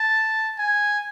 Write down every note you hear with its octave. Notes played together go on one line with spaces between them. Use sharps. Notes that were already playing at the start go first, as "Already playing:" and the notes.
Already playing: A5
G#5